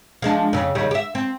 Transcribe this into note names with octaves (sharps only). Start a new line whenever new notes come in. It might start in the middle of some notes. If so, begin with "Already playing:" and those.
F3 G#3 D4
F2 C#3
D#2 C#3 G3
G4 E5
C4